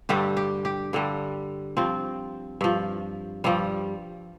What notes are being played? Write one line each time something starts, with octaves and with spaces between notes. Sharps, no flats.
G2 D3 G3 G4
G4
G4
G2 D3 G3
G2 F3 C4
G2 F3
G2 F3 G3